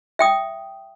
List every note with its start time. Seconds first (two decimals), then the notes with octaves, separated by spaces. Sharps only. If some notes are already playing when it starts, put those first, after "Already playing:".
0.19 E5 G5 D#6